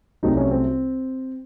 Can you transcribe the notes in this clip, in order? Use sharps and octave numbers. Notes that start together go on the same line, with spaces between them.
C2 C3 F#3 A3 C4 D#4
C#4
C4